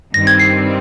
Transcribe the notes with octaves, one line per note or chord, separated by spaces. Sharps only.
G2 D#3 G3 C4 A#6
G#6
C7